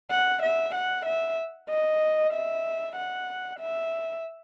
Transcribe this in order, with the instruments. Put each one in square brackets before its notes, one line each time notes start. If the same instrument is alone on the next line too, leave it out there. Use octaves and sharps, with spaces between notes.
[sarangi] F#5
E5
F#5
E5
D#5
E5
F#5
E5